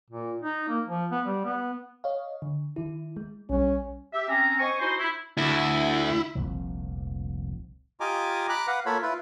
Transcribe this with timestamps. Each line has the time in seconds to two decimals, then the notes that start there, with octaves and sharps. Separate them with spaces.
0.10 A#2
0.42 D#4
0.69 A#3
0.87 F3
1.11 B3
1.26 G3
1.45 B3
2.04 C#5 D#5 F5
2.42 D3
2.76 D#3 E4
3.17 G#3
3.50 B1 G3 C#4
4.13 G4 E5
4.28 C4 C#4 A#5
4.59 C5 D#5 G#5 C#6
4.80 D#4 E4 F#4 C5
4.99 E4
5.38 D2 E4
6.35 F1 C2 A#2 F3
8.00 F4 G4 D#5 G#5 A#5 D6
8.49 A#5 B5 D6 F#6
8.67 B4 F5 F#5
8.86 A#3 F4 A4 C#5 B5
9.02 E4 F4 B4